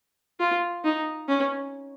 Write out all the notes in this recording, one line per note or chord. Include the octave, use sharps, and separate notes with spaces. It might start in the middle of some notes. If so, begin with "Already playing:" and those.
F4
D#4
C#4